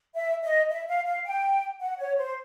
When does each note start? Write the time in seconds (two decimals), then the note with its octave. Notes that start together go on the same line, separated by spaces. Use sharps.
0.15 E5
0.43 D#5
0.70 E5
0.88 F5
1.06 F5
1.25 G5
1.80 F#5
1.99 C#5
2.17 C5